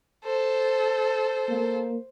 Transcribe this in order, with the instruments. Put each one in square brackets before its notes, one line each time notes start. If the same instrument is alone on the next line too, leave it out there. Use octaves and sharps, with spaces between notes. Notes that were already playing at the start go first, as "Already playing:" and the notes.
[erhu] A4 [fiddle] C5
[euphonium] A#3